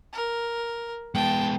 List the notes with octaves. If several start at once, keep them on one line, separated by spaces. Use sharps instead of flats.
A#4
G#3 B3 G5 A5